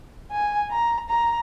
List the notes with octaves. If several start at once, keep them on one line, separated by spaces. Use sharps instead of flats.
G#5
A#5
A#5